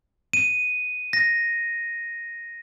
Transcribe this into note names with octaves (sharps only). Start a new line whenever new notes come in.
D#7
A#6